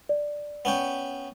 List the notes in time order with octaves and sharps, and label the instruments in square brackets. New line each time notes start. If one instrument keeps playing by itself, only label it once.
[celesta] D5
[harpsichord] B3 C#4 G5